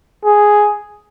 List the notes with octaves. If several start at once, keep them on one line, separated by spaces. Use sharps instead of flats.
G#4